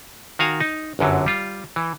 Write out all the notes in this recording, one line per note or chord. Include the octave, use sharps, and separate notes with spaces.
D#3 F#4 F5 G#5 A#5
D#4
G1 F#2 D3 F#3
G3 F4
E3